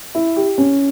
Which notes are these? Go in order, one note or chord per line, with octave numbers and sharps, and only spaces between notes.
E4
G4
C#4